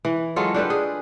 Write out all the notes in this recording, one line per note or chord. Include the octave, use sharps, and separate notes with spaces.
E3
F#3 G#3 F4 A4
D4 G4 A4 B4
G#4